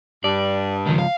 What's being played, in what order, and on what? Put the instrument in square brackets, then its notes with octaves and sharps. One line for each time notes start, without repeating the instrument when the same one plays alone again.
[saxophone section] G2 [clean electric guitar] D5
[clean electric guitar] C#2 F3 [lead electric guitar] D#3
[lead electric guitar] F5